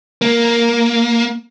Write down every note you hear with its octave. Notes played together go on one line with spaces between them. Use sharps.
A#3